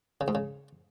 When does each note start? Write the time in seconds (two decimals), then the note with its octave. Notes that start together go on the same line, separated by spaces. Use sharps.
0.21 C#3
0.28 G#2
0.35 C#3